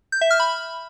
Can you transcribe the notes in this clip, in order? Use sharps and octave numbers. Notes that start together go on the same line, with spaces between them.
G6
E5
F6
B5